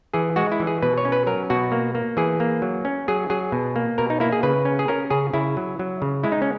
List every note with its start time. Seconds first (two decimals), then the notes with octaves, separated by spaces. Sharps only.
0.14 E3 G#4
0.36 G#3 F#4
0.52 E4
0.60 E3
0.67 G#4
0.82 B2 B4
0.98 C#5
1.05 C#4
1.12 B4
1.27 F#3 A#4
1.50 B2 F#4
1.72 A#3
1.95 A#3
2.17 E3 G#4
2.40 A#3
2.62 F#3
2.85 C#4
3.08 F#3 G#4
3.30 F#3 G#4
3.52 B2
3.76 A#3
3.98 B2 A#4
4.10 D#4
4.20 A#3 E4
4.32 G#4
4.43 C#3 B4
4.65 C#4
4.79 G#4
4.88 C#4 A#4
5.10 C#3 G#4
5.33 C#3 E4
5.57 F#3
5.79 F#3
6.02 C#3
6.23 G#3 E4
6.32 D#4
6.42 C#4